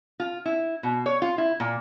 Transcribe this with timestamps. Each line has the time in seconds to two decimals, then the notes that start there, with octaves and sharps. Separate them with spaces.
0.20 F4
0.46 E4
0.83 B2
1.06 C#5
1.22 F4
1.38 E4
1.60 A#2